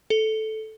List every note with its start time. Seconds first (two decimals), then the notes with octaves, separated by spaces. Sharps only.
0.10 A4